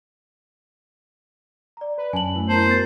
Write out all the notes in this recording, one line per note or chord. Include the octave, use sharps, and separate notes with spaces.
D5 A#5
B4
F#2 G#5 A5 F#7
A3 E4
B3 A#4 C5 A5 A#5
F#4 A6